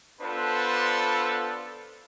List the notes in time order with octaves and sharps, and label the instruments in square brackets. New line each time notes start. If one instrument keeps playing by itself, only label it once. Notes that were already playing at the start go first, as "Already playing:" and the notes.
[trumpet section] B3 D4 F4 A4 B4 C5